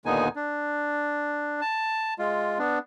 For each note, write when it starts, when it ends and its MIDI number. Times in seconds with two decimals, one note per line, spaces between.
0.06 0.28 39
0.06 0.28 46
0.06 0.28 50
0.06 0.28 59
0.06 0.28 63
0.06 0.28 80
0.36 1.61 62
1.61 2.14 81
2.19 2.58 56
2.19 2.58 65
2.59 2.79 59
2.59 2.79 62